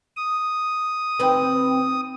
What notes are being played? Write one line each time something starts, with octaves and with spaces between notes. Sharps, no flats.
D#6
D#2 C4 B4